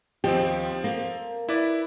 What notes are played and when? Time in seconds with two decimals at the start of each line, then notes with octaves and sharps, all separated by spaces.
0.24 D#2 F3 C4 G4
0.84 A#3
1.49 E4 B4 D5